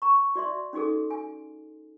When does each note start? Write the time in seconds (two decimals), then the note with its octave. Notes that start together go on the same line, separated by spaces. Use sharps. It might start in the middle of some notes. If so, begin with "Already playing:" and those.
0.02 A#5 C#6
0.36 F#4 D5 E5 C6
0.73 C#4 D#4 F#4 G#4 A4
1.11 G#5